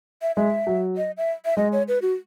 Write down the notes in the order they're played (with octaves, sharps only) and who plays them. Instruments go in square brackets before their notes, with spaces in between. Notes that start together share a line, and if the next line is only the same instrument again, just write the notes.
[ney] E5
[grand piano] G#3 [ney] E5
[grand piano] F#3
[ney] D#5
E5
E5
[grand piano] G#3 [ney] D#5
[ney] C#5
B4
F#4